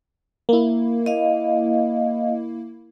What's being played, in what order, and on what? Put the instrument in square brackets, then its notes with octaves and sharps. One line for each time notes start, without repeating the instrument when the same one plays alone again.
[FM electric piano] A#3 E4
[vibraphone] D#5 F5